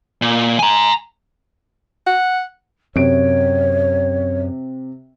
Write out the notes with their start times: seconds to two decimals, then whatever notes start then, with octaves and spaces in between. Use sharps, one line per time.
0.22 A#2
0.59 G#5 A#5
2.06 F#5
2.96 F#2 C3 C#5 D7